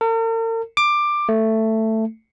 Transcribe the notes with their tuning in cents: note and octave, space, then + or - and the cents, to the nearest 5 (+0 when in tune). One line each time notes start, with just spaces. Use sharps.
A#4 -45
D6 +15
A3 +10